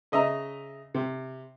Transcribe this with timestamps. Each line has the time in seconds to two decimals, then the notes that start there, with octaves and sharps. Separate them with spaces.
0.12 C#3 D#5 E5 A#5
0.94 C3